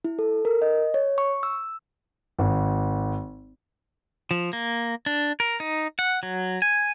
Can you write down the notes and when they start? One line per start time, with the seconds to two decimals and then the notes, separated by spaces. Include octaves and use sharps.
0.05 E4
0.19 A4
0.45 A#4
0.62 D#5
0.94 C#5
1.18 C#6
1.43 E6
2.39 G#1
4.31 F3
4.53 A#3
5.06 D4
5.40 A#4
5.60 D#4
5.99 F#5
6.23 F#3
6.62 G#5